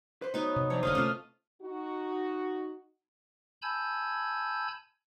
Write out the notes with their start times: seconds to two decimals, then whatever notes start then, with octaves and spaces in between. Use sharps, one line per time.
0.22 B4 C5
0.34 F#3 B3 D#4
0.56 C3
0.70 F3 F#3 D4 C#5
0.83 D#1 D2 D3 A#3 C5 D#5 D#6 F6
0.95 C3 A3 C4 C#4 F4
1.62 D#4 F#4
3.62 G#5 A5 B5 E6 G6 G#6